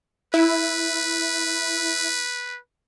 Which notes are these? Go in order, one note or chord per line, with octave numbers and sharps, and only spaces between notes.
E4 B4